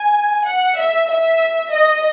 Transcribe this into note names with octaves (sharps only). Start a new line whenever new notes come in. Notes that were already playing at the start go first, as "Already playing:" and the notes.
Already playing: G#5
F#5
E5
E5
D#5